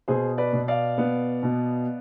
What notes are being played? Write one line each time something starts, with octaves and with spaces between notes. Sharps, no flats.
B2 G#4 C5
B4 D5
B2
D5 F5
B3
B2